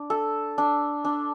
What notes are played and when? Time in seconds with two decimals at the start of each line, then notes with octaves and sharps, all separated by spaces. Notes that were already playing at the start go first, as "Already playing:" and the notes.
Already playing: D4
0.10 A4
0.58 D4
1.05 D4